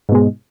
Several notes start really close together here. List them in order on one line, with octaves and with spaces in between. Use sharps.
G#2 B2 G#3